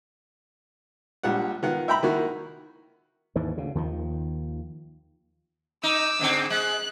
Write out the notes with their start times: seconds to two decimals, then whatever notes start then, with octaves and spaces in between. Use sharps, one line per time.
1.23 A#1 G3 F4 F#5
1.63 D#3 B3 F4 F#5
1.88 E5 G5 A#5 B5
2.03 D#3 A#3 E4 F#4
3.36 D#2 G#2 E3
3.57 D2 C#3
3.75 D#2 D#3 F3
5.83 D#4 D6 E6
6.19 G#2 D3 C4
6.50 G#3 F#6